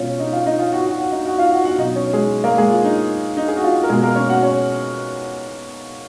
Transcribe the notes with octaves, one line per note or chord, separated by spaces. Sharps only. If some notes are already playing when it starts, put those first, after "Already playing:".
Already playing: B2 G#3 B3 C#4 F4 C#5
D#4 D#5
F4 F5
D#4 D#5
F4 F5
F#4 F#5
F#4 F#5
F#4 F#5
D#4 D#5
F#4 F#5
F4 F5
F#4 F#5
F#4 F#5
B2 F#3 B3 D#4 D#5
C#4 C#5
G#3 G#4
A#3 A#4
G#3 G#4
F4
D#4
D#4
G#4
F#4
F4
A#4
B2 G#3 B3 G#4
A#3 A#4
C#4 C#5
F#4 F#5
C#4 C#5